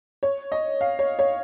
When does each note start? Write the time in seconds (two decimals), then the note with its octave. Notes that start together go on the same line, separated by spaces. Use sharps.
0.23 C#5
0.52 D#5
0.81 F5
0.99 C#5
1.19 C#5